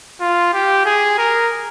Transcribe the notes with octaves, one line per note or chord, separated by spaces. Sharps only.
F4
G4
G#4
A#4